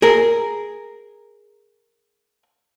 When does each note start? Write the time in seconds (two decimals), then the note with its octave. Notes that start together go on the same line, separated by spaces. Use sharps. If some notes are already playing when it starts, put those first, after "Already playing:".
0.02 G#4 A#4